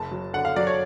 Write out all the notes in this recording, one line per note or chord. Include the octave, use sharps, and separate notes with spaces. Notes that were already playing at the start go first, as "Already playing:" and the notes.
Already playing: F#1 A5
F#3
D3 F#5
F5
F#3 D5
C#5